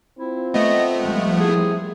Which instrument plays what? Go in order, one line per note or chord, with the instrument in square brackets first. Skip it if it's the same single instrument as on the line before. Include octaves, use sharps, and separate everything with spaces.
[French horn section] C4 F4 [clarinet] E4
[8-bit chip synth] A3 B3 [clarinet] D#5
[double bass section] F3 G3 [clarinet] G#3
[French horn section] A#3 C4 E4 [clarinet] G#4